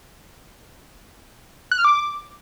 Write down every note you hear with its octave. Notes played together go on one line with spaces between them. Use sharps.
F#6
F6
D6